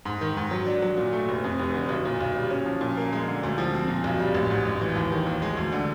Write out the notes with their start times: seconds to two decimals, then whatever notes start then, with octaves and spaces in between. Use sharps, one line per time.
0.05 G#2
0.21 D#3
0.37 G#2
0.51 F#3
0.66 D4
0.82 F#3
0.97 A#2
1.13 A3
1.29 F1
1.44 F2
1.59 F1
1.75 D3
1.89 B1
2.05 A#2
2.21 B1
2.36 G3
2.51 C#4
2.66 F3
2.81 A#2
2.97 A#3
3.13 G#3
3.28 D3
3.43 D2
3.58 F3
3.74 C4
3.88 A#2
4.04 B1
4.19 G3
4.34 A1
4.50 G#2
4.65 A1
4.81 E3
4.95 D#2
5.12 D#3
5.26 D#2
5.42 G#3
5.57 D2
5.72 D3